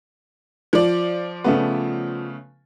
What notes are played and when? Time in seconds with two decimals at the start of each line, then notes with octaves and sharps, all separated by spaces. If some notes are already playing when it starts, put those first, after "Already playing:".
0.73 F3 D5
1.44 C#3 A3 B3